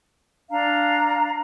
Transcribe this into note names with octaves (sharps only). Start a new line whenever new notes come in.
D4 F5 A#5